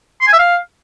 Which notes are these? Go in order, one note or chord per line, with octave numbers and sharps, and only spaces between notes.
C6
G#5
E5
F5